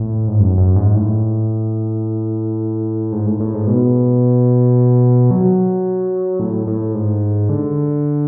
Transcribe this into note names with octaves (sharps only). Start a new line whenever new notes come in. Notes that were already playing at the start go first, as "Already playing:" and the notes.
Already playing: A2
G#2
F#2
F#2
G#2
A2
G#2
A2
A2
G#2
B2
F#3
A2
A2
G#2
D3